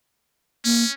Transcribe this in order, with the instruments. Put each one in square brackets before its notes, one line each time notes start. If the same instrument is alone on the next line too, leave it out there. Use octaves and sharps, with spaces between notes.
[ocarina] A#3 [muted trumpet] C#4